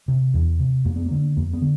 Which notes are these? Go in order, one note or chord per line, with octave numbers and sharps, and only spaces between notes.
C3
E2
C3
F2 A#3
B3
A#3
D3
F2 A#3
B3
D3